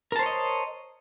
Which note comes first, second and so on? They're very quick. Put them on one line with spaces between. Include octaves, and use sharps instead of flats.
A#4 A5 C5 C#5 D#5